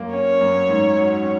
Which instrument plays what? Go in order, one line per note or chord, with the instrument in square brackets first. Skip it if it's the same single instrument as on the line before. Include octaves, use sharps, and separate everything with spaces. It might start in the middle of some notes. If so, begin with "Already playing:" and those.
Already playing: [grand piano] F#2 A#3
[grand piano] C#4 [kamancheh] C#5
[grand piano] F#2
G#2
F#3
C#4